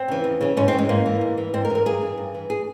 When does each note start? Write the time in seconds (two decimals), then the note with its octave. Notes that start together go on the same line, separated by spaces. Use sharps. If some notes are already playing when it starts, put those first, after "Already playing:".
Already playing: C4
0.08 C#3 E3
0.24 E2
0.41 C#3 E3
0.57 G#2 C#4
0.68 C4
0.73 E3
0.78 G#3
0.89 G#2 A#3
1.06 E3
1.21 G#2
1.38 E3
1.54 G#2 C4
1.65 A#4
1.70 E3
1.75 A#4
1.85 G2 G#4
2.01 E3
2.17 G2
2.34 E3
2.50 G#4